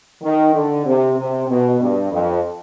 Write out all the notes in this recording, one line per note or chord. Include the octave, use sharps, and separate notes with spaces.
D#3
D3
C3
C3
B2
G2
F2